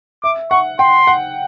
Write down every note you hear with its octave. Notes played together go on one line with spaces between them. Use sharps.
E5 D6
F#5 C#6
G5 C6
F#5